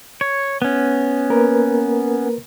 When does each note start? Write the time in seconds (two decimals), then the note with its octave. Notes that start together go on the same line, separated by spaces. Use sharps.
0.21 C#5
0.62 B3 C#4
1.30 A#3 A#4 B4